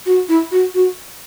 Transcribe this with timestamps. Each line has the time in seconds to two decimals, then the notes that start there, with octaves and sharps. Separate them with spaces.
0.06 F#4
0.29 E4
0.51 F#4
0.75 F#4